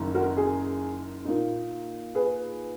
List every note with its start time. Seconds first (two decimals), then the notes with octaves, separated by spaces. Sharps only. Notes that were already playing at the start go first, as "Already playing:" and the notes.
Already playing: F#1 F#2 D#3
0.15 F#4 A#4
0.37 G#4
1.25 A#2 A#3 D#4
2.15 G#4 B4